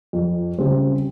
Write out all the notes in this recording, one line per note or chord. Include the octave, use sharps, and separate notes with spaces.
F2
C#3 G3 C4